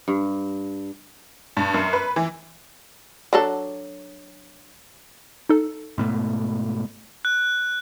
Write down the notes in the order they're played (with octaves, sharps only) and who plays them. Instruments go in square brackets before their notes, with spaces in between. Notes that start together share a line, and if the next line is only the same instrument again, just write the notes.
[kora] G2
[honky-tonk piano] G2
F#2
B4
E3
[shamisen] F#3 D4 A4
[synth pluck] D#4 A4
[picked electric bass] G#2 B2 A3
[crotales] F#6